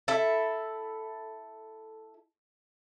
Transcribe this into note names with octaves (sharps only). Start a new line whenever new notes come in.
E4 A4 E5